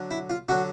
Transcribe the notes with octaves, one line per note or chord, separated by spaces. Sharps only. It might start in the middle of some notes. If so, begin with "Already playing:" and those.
Already playing: D3 F#3
E4
F4
D3 F#3 F#4